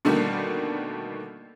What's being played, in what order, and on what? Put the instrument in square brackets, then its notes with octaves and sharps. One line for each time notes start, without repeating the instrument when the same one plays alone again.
[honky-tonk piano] B2 D3 D#3 G3 A3 A#3